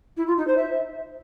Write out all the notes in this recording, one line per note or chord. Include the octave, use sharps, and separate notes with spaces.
E4
F4
D#4
C5
E5